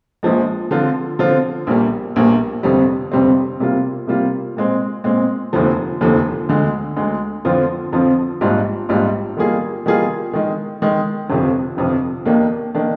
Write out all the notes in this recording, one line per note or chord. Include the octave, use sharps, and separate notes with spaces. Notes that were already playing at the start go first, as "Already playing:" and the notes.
A#1 A#2 F3 G#3
D3 F3 C4 F4
D3 F3 C4 F4
A#1 A#2 G3 A#3
A#1 A#2 G3 A#3
G1 F2 C3 G3 C4
G1 F2 C3 G3 C4
C3 G3 A#3 F4
C3 G3 A#3 F4
A#2 G#3 C4
A#2 G#3 C4
F1 D#2 D3 F3
F1 D#2 D3 F3
D2 D3 G#3
D2 D3 G#3
F2 D3 F3 C4 F4
F2 D3 F3 C4 F4
A#1 G#2 G3 D4 F4
A#1 G#2 G3 D4 F4
D#3 G3 A#3 F4 G#4
D#3 G3 A#3 F4 G#4
D#3 G#3 D#4
D#3 G#3 D#4
G1 F2 C3 F3
G1 F2 C3 F3
D#2 D#3 A#3 D4
D#3 A#3 D4